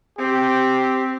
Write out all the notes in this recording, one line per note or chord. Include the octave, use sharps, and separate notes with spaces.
C4 G4